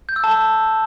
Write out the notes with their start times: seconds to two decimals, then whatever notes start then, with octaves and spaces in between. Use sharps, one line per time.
0.09 G6
0.16 E6
0.24 A5